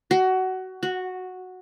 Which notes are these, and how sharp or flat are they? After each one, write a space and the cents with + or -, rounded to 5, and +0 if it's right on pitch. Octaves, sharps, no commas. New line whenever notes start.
F#4 +20
F#4 -5